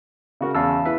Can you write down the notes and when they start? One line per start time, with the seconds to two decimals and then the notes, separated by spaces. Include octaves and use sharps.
0.41 C#3 F#4 A#4
0.55 E2 C#3 F5 A5 E6
0.86 E4 B4 E5